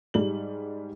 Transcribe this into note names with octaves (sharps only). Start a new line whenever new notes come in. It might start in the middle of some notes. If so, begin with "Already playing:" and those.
G#2 G3 F#7